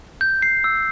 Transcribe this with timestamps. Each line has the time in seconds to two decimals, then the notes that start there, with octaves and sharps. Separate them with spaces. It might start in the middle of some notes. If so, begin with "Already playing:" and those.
0.21 G6
0.42 C7
0.64 E6